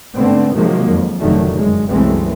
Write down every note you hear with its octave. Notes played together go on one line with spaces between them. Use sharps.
G#2 D3 A3 B3 C4
C3 D#3 F3 F#3 G#3 A#3
F2
F1 A2 D3 D#3 F#3 A3
F#2 G#3
C2 F#2 E3 G#3 A3 C4